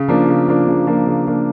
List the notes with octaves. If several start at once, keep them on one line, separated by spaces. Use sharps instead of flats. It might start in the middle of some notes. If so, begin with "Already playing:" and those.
Already playing: C#3
F3 A#3 D4
C#3
F3 A#3 D4
C#3
F3 A#3 D4
C#3
F3 A#3 D4